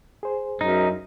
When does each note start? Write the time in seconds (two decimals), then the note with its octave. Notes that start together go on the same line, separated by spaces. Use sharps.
0.23 G#4 C5
0.61 F#2 D#4